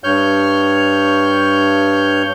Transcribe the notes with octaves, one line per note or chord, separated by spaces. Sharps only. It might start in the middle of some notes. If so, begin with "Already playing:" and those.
G2 C#5 F6 G6